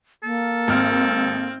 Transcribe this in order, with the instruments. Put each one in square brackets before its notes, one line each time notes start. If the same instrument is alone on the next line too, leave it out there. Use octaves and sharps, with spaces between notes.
[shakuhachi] A#3 [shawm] A4
[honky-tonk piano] G#1 F6 [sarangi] C4